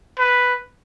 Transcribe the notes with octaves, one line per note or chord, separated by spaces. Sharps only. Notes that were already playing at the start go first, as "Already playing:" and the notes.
B4